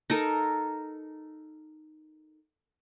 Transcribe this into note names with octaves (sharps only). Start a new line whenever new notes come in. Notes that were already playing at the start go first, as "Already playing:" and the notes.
D#4 A4 A#4